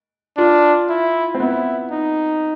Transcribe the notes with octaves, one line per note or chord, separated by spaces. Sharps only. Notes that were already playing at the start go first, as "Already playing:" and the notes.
D4 F4
E4
C4
B3 E4
D#4